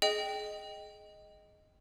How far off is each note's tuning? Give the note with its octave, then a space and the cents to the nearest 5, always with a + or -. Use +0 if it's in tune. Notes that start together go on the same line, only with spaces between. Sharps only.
G#4 +25 D#5 +0 G5 +0